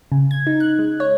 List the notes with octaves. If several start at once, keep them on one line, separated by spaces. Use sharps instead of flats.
C#3
G#6
D#4
F#6
G#3
C#5